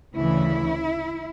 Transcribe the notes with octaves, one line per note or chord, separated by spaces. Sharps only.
D2 C#3 E3 E4